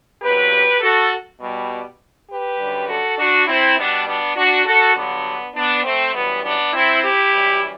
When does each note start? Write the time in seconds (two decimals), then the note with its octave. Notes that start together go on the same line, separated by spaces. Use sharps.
0.21 E2 C3 F#3 G4 B4
0.80 F#4 A4
1.39 B2 G3
2.28 G4 B4
2.59 F#2 D3 G3
2.88 F#4 A4
3.17 D4 F#4
3.46 C4 E4
3.77 B2 G3 B3 D4
4.06 B3 D4
4.36 D4 F#4
4.65 F#4 A4
4.94 G2 D3 F#3 B3 D4
5.54 B3 D4
5.83 A3 C4
6.13 F#2 E3 G3 B3
6.42 B3 D4
6.72 C4 E4
7.02 E4 G4
7.31 F#2 E3 G3